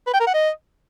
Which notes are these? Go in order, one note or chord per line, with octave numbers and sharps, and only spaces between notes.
B4
G5
A#4
F#5
D#5